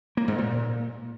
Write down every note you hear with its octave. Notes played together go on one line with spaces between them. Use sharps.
A#3
G#2
A#2